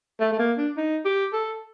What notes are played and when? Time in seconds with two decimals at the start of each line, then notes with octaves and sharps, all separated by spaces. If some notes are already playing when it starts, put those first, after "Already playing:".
0.20 A3
0.32 A3
0.39 A#3
0.58 D4
0.77 D#4
1.05 G4
1.33 A4